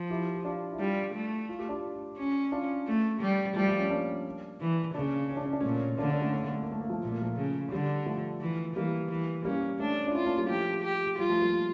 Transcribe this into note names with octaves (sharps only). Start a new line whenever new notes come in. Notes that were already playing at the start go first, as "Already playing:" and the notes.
Already playing: F3
E4 G4
G4
D4 F4
E4
G3 D4 F4
A3
F4
G4
D4 F4
C#4
D4 F4
A3
G3
F3 G3 A3
F3 A3
A3 C#4
A#3 D4
E3
C#3 A#3 D4
C#4
D4
C#4
D4
A#2 A3 C#4
D3 A#3 D4
A#3 D4
A3 C#4
A3
A#3
A3
A#3
A3
A#3
F3 A3
A#2 A3
A#3
F3 A3
C#3
D3 G3
F3 A3
E3
E3 G3 A#3
E3
G3 A#3 C#4
A3 C#4 D4
D4
C#4 E4 F4
A#3 D4
G3 A#3
F3 A3 G4
G4
G3 F4
F3 A3
G3 A#3